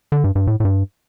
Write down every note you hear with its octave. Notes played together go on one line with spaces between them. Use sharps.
D3
G2
G2
A2
A2
G2